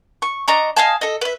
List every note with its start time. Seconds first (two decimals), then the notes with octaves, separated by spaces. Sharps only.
0.22 C#6
0.48 D4 D#5 A#5 C#6
0.76 D#5 F5 G#5 A5
1.01 A4 D#5
1.21 B4 E5